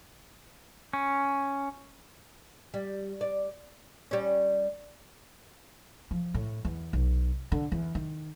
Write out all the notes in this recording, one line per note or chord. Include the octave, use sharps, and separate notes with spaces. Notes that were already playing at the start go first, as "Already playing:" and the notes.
C#4
G3
D5
G3 C#4
F3
A2
E2
B1
D3
E2
D#3